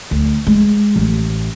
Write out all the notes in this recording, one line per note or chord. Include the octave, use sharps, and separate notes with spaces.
D2
G#3
A1